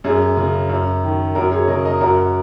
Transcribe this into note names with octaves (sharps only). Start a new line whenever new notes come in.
F#2 G#4
C#3
F#2
D#3
F#2 F#4 A#4
G#4 C#5
C#3 A#4 D#5
A#4 D#5
F#2 F#4 A#4